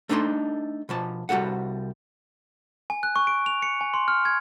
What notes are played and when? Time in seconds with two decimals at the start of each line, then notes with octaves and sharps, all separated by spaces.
0.09 A3 D4 D#4 A4 A#5 C6
0.89 B2 F3 A5
1.29 C2 G3 F#4 A4 F#5
2.90 G#5
3.03 F#6
3.16 C#6
3.27 D7
3.46 F7
3.62 C#7
3.81 G#5
3.94 C6
4.08 F6
4.25 G#6